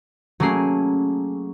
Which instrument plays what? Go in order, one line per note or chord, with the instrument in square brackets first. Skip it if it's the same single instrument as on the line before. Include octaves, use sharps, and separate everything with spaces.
[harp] F#3 A3 A#3 C#4 G#4 C7